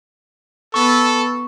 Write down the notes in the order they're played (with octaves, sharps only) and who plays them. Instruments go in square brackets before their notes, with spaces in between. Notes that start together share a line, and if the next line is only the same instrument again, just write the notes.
[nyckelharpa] B3 B4 [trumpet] A4 [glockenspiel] C#6